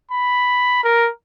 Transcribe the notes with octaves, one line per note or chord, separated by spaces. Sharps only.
B5
A#4